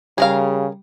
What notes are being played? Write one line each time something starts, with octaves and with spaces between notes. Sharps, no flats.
C#3 G3 G#4 A#4 F5